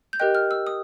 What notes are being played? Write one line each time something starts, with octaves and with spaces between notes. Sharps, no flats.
G6
G4 A#4 D#5 G5 F#6
F6
E6
D#6